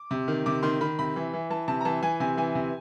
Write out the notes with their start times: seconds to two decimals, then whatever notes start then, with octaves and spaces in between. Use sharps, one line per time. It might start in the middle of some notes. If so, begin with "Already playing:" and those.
Already playing: D6
0.11 C3
0.28 D#3
0.46 C3 D6
0.63 D#3 C6
0.81 D#3 B5
0.99 C3 B5
1.16 E3
1.34 E3
1.50 E3 A5
1.68 C3 A5
1.81 A#5
1.85 E3 A5
2.03 E3 G#5
2.20 C3 G#5
2.38 E3 G#5
2.55 C3